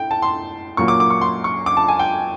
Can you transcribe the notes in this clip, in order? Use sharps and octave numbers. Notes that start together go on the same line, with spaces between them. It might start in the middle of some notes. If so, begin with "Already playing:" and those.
Already playing: A2 G5
A5
C6
A#2 F#3 A#3 C#6
D6
D6
C#6
C6
C#6
D6
A5
G#5
G5